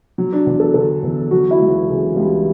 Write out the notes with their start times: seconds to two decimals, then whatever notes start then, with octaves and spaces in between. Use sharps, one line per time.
0.18 F#3
0.33 D4
0.46 E2
0.60 A4
0.74 D3 A4
1.03 E2
1.31 F#3 F#4
1.51 E4
1.60 C#2
1.69 F#4
1.89 C#3
2.16 C#2 G3